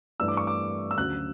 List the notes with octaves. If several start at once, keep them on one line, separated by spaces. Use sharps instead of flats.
G2 E3 A3 D4 E6
D6
C#6
D6
E6
D2 C#3 F#3 F#6